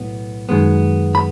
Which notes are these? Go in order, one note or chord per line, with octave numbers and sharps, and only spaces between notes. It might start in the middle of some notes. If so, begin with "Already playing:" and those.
Already playing: B1 A2 B3
F#2 D#3 G#3 B3
B5